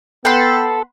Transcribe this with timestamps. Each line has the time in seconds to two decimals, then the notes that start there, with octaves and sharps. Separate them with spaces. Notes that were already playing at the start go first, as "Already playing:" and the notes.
0.25 B3 A4 F#5 G5 B5 C6